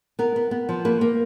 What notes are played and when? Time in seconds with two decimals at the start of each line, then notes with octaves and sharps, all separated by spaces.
0.19 B3 A#4
0.36 B3
0.51 B3
0.69 F3
0.85 A#3 B4
1.01 A#3